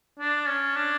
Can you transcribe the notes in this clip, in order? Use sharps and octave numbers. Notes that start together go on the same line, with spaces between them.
D4
C#4
D4